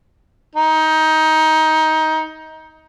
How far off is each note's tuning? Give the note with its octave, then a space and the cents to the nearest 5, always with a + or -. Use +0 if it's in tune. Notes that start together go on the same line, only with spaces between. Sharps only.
D#4 +20